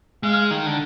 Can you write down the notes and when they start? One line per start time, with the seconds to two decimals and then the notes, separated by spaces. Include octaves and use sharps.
0.23 G#3 F5
0.51 D#3
0.66 D3